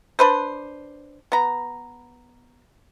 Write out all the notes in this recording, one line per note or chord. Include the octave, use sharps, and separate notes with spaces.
D4 B4 C5
B3 A#5